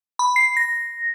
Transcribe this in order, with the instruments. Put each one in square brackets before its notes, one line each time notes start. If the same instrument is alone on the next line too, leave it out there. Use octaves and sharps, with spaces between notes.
[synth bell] B5
C7
A#6